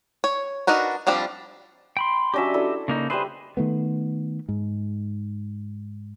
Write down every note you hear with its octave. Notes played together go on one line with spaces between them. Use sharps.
C#5
D4 D#4 F#4 A#4 B4
F3 G3 C4 D4 B5
G5 B5 C6
F#3 C#4 D4 G4 D#5 E5
D4 E4 A4
C#3 A#3 D#4
G3 G#4 B4 C5 E5
D#3 A3 B3
G#2